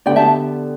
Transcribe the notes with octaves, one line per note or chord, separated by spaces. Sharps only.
D3 B3 G4 D5 G5
E5 A5